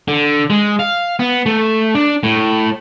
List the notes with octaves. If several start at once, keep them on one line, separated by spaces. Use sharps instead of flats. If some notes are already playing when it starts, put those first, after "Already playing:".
D3
G#3
F5
B3
A3
D4
A2